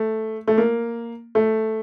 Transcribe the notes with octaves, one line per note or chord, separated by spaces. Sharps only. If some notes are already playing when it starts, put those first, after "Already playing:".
Already playing: A3
A3
A#3
A3